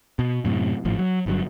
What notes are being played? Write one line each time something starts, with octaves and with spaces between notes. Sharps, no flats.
B2
F#2 A2 C3
G#1 A2 F3
F#3
G1 G2 F#3